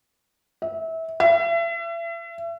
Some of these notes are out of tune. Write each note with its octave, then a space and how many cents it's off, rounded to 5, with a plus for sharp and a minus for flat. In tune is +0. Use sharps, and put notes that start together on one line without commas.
E5 -25
E5 +35